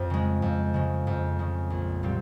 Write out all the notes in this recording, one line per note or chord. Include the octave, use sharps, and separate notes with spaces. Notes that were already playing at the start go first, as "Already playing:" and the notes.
Already playing: F2
C#3 G#3
F2
C#3 G#3
F2
C#3 G#3
A#1
A#2 G3 C4